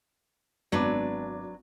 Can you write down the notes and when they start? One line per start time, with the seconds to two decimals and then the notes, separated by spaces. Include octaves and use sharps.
0.72 G#1 F#3 B3 D4 B4 D6